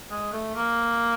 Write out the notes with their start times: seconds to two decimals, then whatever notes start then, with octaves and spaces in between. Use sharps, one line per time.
0.10 G#3
0.33 A3
0.55 A#3